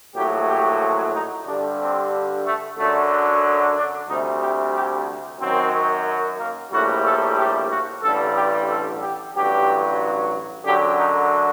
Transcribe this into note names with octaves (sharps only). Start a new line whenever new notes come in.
A#1 A2 F#3 G4
G4
D#4
G2 D3 G3 D4
C4
A3
F#2 D3 F#3 A3
D4
D2 C3 G3 D#4
G4
G4
F#2 D#3 F#3 C4
A#3
A#1 A2 G3 F#4
A4
G4
F#4
A1 G2 D3 G3 A4
G4
A4
G4
A1 G2 F#3 G4
F#2 D3 F#3 G4
D#4